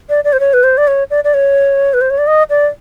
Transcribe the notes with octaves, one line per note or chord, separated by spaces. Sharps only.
D5
D5
C5
C#5
B4
C5
D5
C#5
D5
D5
C#5
B4
C5
C#5
D5
D#5
D5